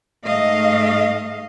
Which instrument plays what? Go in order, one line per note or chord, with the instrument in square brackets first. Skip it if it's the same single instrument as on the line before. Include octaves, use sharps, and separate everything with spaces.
[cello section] G#2 A3 D#5 F5